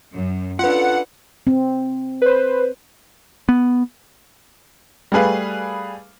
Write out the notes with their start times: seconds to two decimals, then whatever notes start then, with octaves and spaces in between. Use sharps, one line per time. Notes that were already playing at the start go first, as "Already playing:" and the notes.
0.13 F#2
0.59 C#4 D4 F4 A4 B4 F#5
1.47 C4
2.22 B4 C5
3.49 B3
5.12 G3 A3 G#4 B4 F5